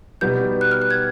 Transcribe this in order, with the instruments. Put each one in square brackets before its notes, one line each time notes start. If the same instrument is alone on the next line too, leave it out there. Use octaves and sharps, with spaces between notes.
[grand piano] B2 G3 B3 D#4 F#4 [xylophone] G6
[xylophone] F#6
F6
F#6
G#6